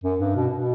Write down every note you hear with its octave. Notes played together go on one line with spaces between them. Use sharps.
F#2
G2
B2
B2